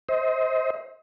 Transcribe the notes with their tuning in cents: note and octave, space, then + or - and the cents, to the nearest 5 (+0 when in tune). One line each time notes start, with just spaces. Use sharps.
C5 +0 D#5 +35